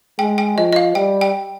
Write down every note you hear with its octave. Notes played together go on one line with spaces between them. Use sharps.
G#3 G5
G5
F3 D#5
D#5
F5
G3 G5
G5